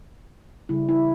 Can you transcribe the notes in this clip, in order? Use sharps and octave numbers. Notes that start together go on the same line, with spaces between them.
C#3 G3 E4
E4